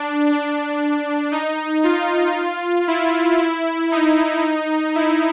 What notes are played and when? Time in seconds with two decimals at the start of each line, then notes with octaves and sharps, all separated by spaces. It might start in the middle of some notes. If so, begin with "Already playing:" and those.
Already playing: D4
0.28 D4
1.32 D#4
1.84 F4
2.88 E4
3.39 E4
3.91 D#4
4.95 E4